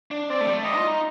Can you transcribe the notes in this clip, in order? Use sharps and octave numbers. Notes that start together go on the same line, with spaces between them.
D4
C4 D5
A3
G3
A3
G3 D#5
F4
D#4